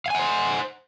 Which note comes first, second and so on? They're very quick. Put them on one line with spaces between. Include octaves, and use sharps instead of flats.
F5 G#5 F#5 C5